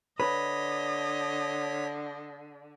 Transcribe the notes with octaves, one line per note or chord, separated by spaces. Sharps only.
D3 B4 C#5 D#5 B6